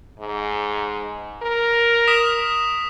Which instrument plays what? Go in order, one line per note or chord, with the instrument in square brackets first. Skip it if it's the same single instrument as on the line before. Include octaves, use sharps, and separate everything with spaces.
[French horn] G#2
A#4
[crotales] D#6 B6 E7